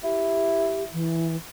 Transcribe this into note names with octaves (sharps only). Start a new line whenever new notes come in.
E4 G4
E3